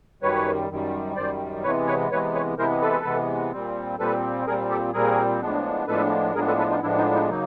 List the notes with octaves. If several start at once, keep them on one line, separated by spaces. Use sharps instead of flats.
F#2 D#3 G3 B4 C#5
F#2 D#3 G3
F#2 D#3 G3 C5 D5
C3 E3 G#3 B3 B4 C#5
B4 C#5
C3 E3 G#3 B3 B4 C#5
B4 C#5
C3 E3 G#3 B3 A#4 C5
A4 B4
C3 E3 G#3 B3
A#2 G3 C4
A#2 G3 C4 A4 B4
A#2 G3 C4 G#4 A#4
G4 A4
A#2 G3 C4 G#4 A#4
A2 F3 G#3 B3 D4
A2 F3 G#3 B3 D4 A4 B4
A2 F3 G#3 B3 D4 G#4 A#4
A4 B4
A4 B4
D#4 F4
A2 F3 G#3 B3 D4 E4
D#4
D#4
C#3 F#3 A#3 D#4